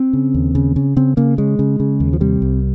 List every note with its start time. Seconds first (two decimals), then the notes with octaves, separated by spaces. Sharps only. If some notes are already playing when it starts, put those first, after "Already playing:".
Already playing: C4
0.13 C#3
0.34 D#2
0.55 C#3
0.76 C#3
0.96 C#3 C4
1.17 C#3 A#3
1.38 C#3 G#3
1.59 C#3
1.80 C#3
2.00 D#2
2.13 F3
2.20 C3 G3
2.42 C2